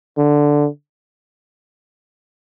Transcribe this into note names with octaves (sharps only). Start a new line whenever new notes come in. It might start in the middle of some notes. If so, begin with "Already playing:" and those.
D3